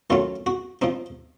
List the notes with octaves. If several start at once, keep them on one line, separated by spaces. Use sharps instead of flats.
D#3 F#3 A3 C#4 F4
F#4
F3 C4 D#4